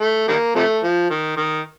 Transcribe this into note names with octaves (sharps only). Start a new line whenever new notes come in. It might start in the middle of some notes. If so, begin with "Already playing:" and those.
A3
D#3 G3 A#3
C3 F3 A3
F3
D#3
D#3